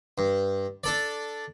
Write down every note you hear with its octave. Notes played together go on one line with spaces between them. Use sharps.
G2
D4 A4 D5